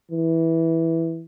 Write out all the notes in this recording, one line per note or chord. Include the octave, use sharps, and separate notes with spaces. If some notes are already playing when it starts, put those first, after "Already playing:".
E3